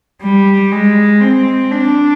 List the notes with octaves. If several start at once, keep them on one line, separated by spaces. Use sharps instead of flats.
G3
G#3
C4
D4